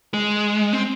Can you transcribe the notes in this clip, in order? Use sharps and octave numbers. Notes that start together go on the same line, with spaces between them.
G#3
C4